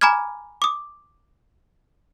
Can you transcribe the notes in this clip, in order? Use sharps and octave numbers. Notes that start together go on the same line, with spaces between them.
G#5 A#5 B5 D6 F6 G#6
D6 D#6